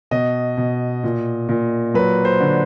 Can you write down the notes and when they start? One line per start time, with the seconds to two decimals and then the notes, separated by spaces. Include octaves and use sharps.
0.11 B2 D#5
0.57 B2
1.04 A#2
1.49 A#2
1.94 F#3 B4
2.25 C5
2.40 D3